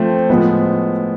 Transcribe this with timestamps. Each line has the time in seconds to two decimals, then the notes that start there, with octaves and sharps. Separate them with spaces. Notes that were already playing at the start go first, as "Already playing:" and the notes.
Already playing: F3 A3 C4
0.30 A2 F3 G#3 B3